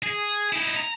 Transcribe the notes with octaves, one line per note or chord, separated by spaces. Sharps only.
G#4
D#4 E4
A#5